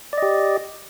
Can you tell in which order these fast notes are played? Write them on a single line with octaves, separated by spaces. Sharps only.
D5 D#5 G4